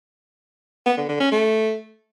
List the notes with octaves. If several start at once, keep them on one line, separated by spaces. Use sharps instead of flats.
B3
D3
D3
C#4
A3